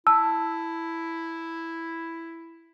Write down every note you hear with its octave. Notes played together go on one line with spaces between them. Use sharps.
E4 A5 E6